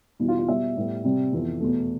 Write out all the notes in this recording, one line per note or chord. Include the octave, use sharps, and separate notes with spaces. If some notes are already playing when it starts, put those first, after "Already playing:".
E2 B2 G3 E4
F4
F4
B2 G3 B3 E5
A2 G3 B3
C3 G3 C4
F2 E3 B3
E2 B2 A3